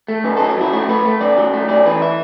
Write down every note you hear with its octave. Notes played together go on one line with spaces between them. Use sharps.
A3
F#2 B4
F#3 A4
F#4
F#2 E4
A3 F#4
A3 B4
A3
F#2 D5
F#3
A3
F#2 D5
E3 B4
E5